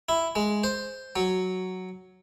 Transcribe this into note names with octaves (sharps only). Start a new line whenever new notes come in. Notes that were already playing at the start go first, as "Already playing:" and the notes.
E4
G#3
C5
F#3